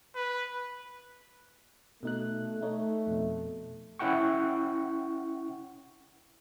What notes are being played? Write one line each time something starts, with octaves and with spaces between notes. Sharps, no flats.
B4
B2 A3 D#4 F#6
A3 D#4 C#5
F2 B2
C#4 E4 F#5 G5 C#6